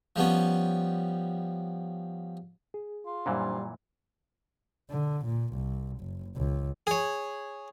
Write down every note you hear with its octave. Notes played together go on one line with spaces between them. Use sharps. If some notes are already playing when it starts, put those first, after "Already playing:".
F3 G3 B3 C#4
G#4
F4
F#2 A#2 E3 G3 D4 C5 F5
D3
A#2
C2
F#1
C#2
G#4 C#5